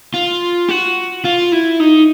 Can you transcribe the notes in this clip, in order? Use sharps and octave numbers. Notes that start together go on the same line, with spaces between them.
F4
F#4
F4
E4
D#4